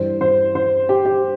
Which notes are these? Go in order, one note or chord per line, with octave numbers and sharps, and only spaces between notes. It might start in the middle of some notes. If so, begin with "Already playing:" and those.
Already playing: G2 E3 G3 C5
C5
C5
G4
G4